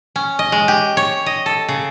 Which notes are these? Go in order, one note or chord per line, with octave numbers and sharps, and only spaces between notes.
C#4
D#5
G#3
G4
C#5
D#5
A4
C#3